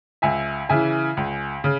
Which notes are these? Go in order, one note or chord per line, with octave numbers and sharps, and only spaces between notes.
C#2 E5 G#5
C#3 E3 E5 G#5
C#2
C#3